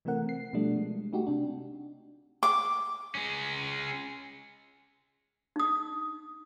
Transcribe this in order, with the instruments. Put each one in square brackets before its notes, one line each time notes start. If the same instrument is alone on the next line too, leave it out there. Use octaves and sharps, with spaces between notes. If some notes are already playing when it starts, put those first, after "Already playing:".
[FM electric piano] C3 E3 A3 C4 A#4 F#5
C7
B2 F3 G3 A3 D4
G#3
A3 D#4 F#4 G4
C3 D4
[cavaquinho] D6
[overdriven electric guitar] G#3 C#4
[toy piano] D#4 D#6